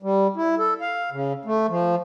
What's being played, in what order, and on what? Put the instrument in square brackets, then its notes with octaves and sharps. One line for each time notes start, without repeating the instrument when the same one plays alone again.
[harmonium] G3
E4
A4
F5
C#3
A3
F3